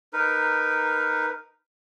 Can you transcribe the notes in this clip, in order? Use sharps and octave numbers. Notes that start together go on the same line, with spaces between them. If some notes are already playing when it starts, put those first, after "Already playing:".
D#4 A#4 B4